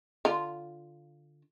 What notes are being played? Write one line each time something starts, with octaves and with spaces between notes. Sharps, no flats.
D3 F4